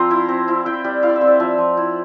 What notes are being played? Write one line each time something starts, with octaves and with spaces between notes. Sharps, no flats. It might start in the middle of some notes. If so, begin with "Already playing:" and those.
Already playing: F3 C4 A#5 C6
E4
C4
E4
E4 G5
G3
E4 F5
D5
E5
C4
D5
F3 E5
F3
E4